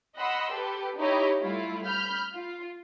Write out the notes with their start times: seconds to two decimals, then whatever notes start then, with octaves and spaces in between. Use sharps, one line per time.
0.15 D#5 F#5 B5 C6 E6
0.51 G4 A4 B4
0.97 D#4 E4 G4 C#5 D#5
1.40 G3 A3 E4 F4
1.86 B5 F6 G6
2.33 F4